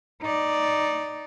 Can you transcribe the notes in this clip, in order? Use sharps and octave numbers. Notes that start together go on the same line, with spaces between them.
D#4 D5